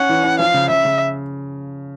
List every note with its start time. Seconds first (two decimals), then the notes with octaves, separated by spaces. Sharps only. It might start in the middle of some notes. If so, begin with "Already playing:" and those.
Already playing: C#4 F#5
0.09 E3
0.24 C#4
0.39 F3 F5
0.54 C#3
0.69 C#3 E5
0.85 C#3